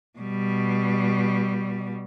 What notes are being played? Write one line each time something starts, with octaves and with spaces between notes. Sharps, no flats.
B2 G3